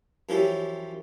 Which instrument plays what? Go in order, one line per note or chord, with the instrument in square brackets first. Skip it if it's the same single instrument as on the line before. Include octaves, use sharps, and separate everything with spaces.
[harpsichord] F#2 E3 F3 C#4 E4 G4